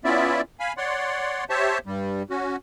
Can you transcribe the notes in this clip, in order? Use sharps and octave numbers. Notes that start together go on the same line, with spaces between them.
B3 C#4 E4 F4 D5 E5
F5 G#5 B5
C#5 D5 F#5 C6
G4 C5 C#5 E5 A5
G2 G3
C#4 F#4